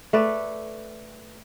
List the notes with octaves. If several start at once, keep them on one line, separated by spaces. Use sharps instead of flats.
A3 B4 D5